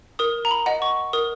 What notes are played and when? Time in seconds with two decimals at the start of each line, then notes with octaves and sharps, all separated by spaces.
0.19 A#4 D#6
0.45 A#5
0.51 B5
0.66 D#5 F#5
0.82 C#6
1.13 A#4 D#6